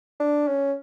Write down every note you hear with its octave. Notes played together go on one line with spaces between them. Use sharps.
D4
C#4